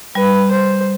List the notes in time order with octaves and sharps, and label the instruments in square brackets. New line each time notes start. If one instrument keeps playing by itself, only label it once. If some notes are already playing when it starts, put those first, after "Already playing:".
[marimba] G3 [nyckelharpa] B4
[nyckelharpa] C5